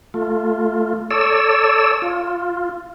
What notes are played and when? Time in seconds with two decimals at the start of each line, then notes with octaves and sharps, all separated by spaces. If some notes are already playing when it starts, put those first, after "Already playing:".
0.14 A3 F4
1.11 A4 C#5 D5 E6
2.02 F4